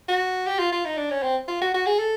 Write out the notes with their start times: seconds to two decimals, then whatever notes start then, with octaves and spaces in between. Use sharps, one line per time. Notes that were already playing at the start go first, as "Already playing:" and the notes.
0.08 F#4
0.47 G4
0.59 F4
0.72 F4
0.85 D#4
0.97 D4
1.10 C#4
1.23 C4
1.48 F4
1.61 F#4
1.74 F#4
1.87 G#4
1.99 A4